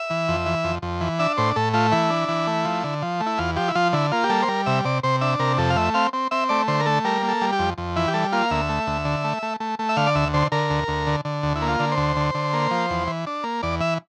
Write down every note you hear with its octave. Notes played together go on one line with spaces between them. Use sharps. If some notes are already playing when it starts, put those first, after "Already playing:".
Already playing: E5
E3
F2
E3
F2
F2
E3
D4 E5
A2 C5
A2 A4
A3 F4
E3 E4
D4
E3
A3
F3
D3
F3
A3
E4
E2 F4
F3 G4
E4
F3 F4
D3 E4
A#3 F4
G4
G3 A4
C5
G3 A#4
C3 E5
C3 D5
C3 C5
D4 E5
C3 A#4
F2 A4
F5
A3 E5
C4 F5
C4
C4 E5
A3 D5
D3 C5
A#4
A3 A4
G3 A#4
A#3
A4
G3
G4
F2
F2
E3 E4
G4
G3 A4
A#3 F4
F5
D2 E5
A3
D2
D3
A3
A3
A3
A3
E5
D3 F5
D5
D2 E5
D3 C5
D3 A#4
D2
D2
D3
D3
D2
E4
A#3
F4
D3
C5
D2
D3
D3
A#3
F3
E2
E3
D4
A#3
E2 D5
E3 E5